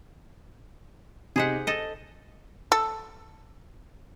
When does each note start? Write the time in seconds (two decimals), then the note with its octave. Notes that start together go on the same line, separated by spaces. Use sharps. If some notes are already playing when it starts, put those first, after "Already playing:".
1.36 C3 D#4 G#4 C5 F#5 B6
1.67 A4 D#5 A6
2.72 A4